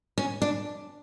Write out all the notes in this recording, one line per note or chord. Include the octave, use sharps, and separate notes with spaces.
C#4
D4